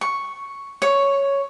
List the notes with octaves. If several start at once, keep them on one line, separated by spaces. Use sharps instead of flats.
C#6
C#5